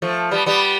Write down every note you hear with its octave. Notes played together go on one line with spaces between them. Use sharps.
F3 A3
G3 B3
G3 B3